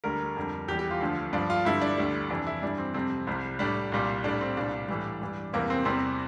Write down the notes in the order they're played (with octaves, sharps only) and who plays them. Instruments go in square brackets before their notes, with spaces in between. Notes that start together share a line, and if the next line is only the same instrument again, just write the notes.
[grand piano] D2 D3 G3 A#4
F2 D3 G3
E2 G4
E3 G3
G4
F4
D2 D3 F3
G2 F3 D4
F4
G2 D3 G3 E4
D4
D2 D3 G3
F2 C3 E3 D4
E4
G2 E3 G3 D4
C4
F2 C3 G3 C4
C2 C3 G3
A2 G3 D4
C2 A#2 G3
A2 G3 D4
C4
C2 A#2 G3 D4
A2 E3 G3
G2 E3 G3
E2 C3 E3 G3 A#3
C4
E2 C3 G3 C4